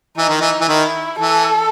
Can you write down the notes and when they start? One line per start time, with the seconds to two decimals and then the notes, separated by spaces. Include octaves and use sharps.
0.18 E3 D#4
0.29 D#3
0.41 E3
0.61 E3
0.68 D#3 E4
1.19 E3 A4